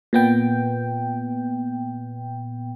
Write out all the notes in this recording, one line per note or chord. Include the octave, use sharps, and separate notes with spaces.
A#2 B3 G5